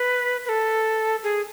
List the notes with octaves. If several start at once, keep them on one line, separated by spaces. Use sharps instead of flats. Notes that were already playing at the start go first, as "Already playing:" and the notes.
Already playing: B4
B4
A4
G#4